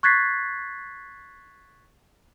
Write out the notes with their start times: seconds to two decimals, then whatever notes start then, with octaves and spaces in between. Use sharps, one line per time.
0.03 C#6 F#6 G#6 A6 B6 C7